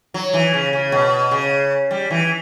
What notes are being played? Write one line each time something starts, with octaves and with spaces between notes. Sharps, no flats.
F#3
E3
C#3
C#3
B2
C#3
G3
E3